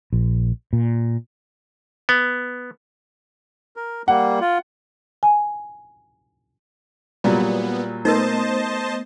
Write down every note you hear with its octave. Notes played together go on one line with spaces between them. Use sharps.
A#1
A#2
B3
A#4
G3 A#3 F#5
F4
G#5
A#2 F#3 G3 B3
A3 B3 D#4 A#4 C5 D#5 A5